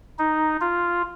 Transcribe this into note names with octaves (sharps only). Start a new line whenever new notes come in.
D#4
F4